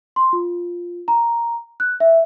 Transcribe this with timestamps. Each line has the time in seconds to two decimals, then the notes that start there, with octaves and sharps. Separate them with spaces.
0.16 C6
0.33 F4
1.08 A#5
1.80 F#6
2.00 E5